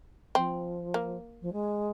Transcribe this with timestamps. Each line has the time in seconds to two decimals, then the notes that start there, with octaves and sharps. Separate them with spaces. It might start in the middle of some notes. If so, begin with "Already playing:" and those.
0.35 F3 C4
0.94 A#3
1.41 F3
1.53 G#3